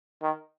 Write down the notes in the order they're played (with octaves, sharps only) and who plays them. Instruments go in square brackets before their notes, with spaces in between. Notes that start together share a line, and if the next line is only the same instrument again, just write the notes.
[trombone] D#3